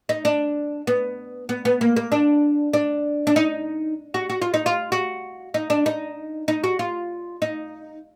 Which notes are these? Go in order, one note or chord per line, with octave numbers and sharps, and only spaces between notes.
D#4
D4
B3
B3
B3
A#3
A#3
D4
D4
D4
D#4
F#4
F#4
F4
D#4
F4
F#4
D#4
D4
D#4
D#4
F#4
F4
D#4